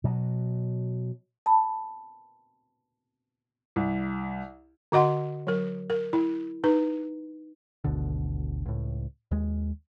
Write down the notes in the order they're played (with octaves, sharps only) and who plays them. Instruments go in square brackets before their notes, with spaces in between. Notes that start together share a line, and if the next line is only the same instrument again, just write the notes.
[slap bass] B2 F#3
[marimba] A5 B5
[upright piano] C2
[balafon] D3 F#4 D#5 F#5 C6
F#3 A#4
A#4
E4
D#4 B4
[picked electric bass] G#1 D2 B2 D3
C#2 A2
D#2 G#3